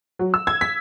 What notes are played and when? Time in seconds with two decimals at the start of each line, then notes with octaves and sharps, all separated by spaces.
0.19 F#3
0.34 E6
0.47 G#6
0.61 B6